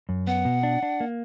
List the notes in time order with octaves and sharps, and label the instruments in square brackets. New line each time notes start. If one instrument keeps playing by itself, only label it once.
[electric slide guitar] F#2
[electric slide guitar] B3 [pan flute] F#5
[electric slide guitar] B2
D4
D4
A#3